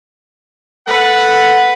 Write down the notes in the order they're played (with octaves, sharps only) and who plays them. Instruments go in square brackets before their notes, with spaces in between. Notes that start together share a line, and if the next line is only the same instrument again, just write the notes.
[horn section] A4 F#5 [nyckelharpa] B4